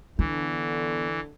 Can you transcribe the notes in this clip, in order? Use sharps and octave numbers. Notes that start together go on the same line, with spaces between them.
D3 E3 B3